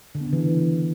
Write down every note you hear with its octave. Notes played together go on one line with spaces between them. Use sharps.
D3
B3
C#3
E3